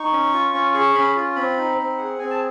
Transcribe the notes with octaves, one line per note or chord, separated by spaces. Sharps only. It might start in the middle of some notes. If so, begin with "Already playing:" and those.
Already playing: D#4 C#6
C#4
F4
C#4
G#4 C#6
C#4 B5
F4
C4 B5
D#4
C4
G#4 F#5
C4 G#5
A5